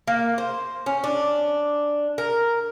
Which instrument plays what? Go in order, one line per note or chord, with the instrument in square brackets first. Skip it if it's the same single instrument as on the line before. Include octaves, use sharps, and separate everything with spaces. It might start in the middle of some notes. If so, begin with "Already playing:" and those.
[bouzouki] A#3
C5
C#4
D4
A#4